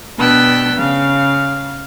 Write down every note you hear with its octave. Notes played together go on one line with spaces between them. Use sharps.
B2 B3 D4 G5 E6 F#6
C#3 F5